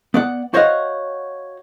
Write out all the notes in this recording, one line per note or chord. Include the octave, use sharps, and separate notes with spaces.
B3 D5 F#5
F#4 C5 C#5 D#5 F5 F#5